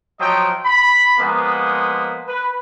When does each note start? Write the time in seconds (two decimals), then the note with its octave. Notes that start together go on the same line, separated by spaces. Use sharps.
0.20 F3 F#3 D#5 G5
0.65 B5
1.19 F3 G#3 A#3 B3
2.28 B4